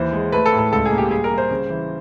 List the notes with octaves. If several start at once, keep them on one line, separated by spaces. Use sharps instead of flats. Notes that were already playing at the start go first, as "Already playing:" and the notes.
Already playing: D#2 E3 C5
G#3
A3 B4
A4
A2
A4
C#2 A4
G#4
A#3
G4
G3 G#4
A#4
G3
C5
C#3
E3